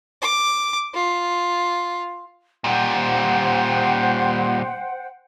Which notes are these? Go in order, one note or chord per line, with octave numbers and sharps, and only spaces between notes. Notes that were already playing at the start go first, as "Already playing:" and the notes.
D6
F4
A#2 G3 C5 F#5 G5